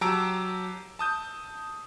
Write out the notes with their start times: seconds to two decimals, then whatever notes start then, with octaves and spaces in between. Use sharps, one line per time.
0.01 F#3 G4 A5 A#5 E6 D7
0.99 A5 D#6 G6